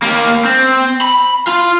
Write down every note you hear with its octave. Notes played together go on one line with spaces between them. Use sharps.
A#3 G4
C4
B5
F4